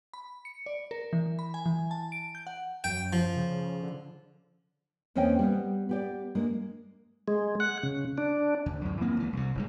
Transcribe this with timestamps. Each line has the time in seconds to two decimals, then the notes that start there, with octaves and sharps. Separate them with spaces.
0.14 B5
0.45 C#7
0.66 D5
0.91 A#4
1.13 E3
1.39 B5
1.54 G#5
1.66 E3
1.91 A5
2.12 D7
2.35 G6
2.47 F#5
2.84 F#2 G5
3.13 F3
3.36 C#3
3.83 D3
5.15 E2 A#3 C4 C#4 D#5 G5
5.39 G3 B3
5.89 B3 G4 D5
6.35 G#3 A#3 D4
7.28 G#3
7.60 F#5
7.83 C#3
8.18 D4
8.66 D2
8.81 F#2 A2
9.01 E3 A#3 C4
9.17 C#2 E3
9.33 C2 C3
9.55 F#1 G#2 G#3